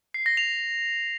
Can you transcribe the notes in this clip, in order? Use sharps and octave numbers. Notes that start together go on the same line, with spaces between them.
C7
A#6
F7